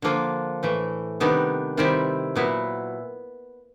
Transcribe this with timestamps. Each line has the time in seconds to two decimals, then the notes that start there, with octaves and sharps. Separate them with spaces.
0.02 D3 F3 A#3 D4 F4
0.63 A2 E3 A3
1.20 C3 D#3 G3 B3 D4
1.77 C3 D#3 G3 C4 E4
2.36 A#2 F#3 B3 E4